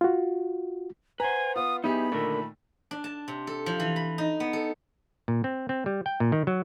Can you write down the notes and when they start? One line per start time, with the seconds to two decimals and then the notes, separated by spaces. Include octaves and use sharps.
0.01 F4 F#4
1.20 B4 C5 F#5 G#5 A#5
1.56 B3 F4 D#6
1.84 B3 D#4 E4 G4 G#4 B5
2.12 A#2 D3 D#3 A3 A#4
2.91 D4
3.04 A5
3.28 C3
3.47 A4
3.66 F3
3.80 E3
3.96 B5
4.18 D#4
4.40 B3
4.53 A4
5.28 A#2
5.44 C4
5.69 C4
5.86 G3
6.06 G5
6.20 A#2
6.32 D#3
6.47 F#3